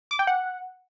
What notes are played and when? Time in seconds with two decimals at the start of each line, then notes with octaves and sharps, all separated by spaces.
0.11 D6
0.19 G5
0.27 F#5